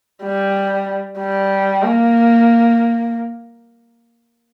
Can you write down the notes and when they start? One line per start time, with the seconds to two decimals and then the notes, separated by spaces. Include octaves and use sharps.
0.23 G3
1.19 G3
1.83 A#3